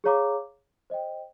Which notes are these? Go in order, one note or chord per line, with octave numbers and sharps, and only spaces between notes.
G#4 C#5 F5 A#5 D6
C5 D#5 G5